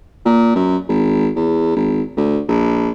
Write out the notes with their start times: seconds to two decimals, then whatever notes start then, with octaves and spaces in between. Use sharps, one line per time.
0.25 A#2
0.56 F#2
0.88 G#1
1.36 E2
1.76 G#1
2.17 D2
2.49 A#1